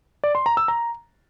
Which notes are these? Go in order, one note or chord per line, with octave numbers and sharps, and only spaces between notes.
D5
C6
A#5
E6
A#5